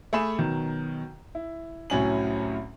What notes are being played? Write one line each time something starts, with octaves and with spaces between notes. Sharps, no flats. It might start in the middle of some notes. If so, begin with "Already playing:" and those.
A3 G#4 B5 E7
B2 D#3 F#3
E4
C2 A2 F#3 C#4 G#5 F#7